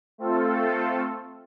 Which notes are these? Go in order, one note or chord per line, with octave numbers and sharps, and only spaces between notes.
A3 C4 F4 A4